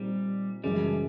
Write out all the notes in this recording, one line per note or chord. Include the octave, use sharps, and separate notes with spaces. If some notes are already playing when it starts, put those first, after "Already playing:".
Already playing: A#2 G3 C4 D#4
F#2 C#3 E3 G3 G#3 C#4